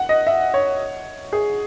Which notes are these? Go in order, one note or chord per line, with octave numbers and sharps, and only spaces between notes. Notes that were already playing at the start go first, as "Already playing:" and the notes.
Already playing: F#5
D#5
E5
C#5
G#4